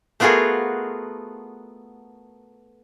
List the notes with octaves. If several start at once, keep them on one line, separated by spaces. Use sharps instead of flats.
A3 B3 F4 F#4 G#4 A#4